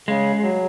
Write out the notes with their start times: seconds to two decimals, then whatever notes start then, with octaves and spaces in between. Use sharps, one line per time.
0.08 C#3 G#3
0.42 F#3